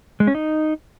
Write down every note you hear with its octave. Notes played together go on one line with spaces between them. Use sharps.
G#3
C#4
D#4